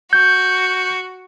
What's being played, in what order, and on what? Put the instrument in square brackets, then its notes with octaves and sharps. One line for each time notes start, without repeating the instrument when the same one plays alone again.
[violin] F#4 [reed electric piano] G6